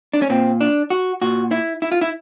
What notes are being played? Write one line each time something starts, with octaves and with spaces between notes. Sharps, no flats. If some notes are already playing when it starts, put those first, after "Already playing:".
D4
C#4
A#2 C4
D4
F#4
A#2 F#4
E4
E4
F4
E4